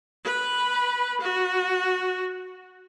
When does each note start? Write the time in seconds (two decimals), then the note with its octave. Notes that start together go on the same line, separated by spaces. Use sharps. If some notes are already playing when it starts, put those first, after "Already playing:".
0.24 B4 B5
1.20 F#4